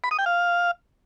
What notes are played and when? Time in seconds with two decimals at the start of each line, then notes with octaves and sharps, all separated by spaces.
0.04 B5
0.11 D#6
0.19 G5
0.26 F5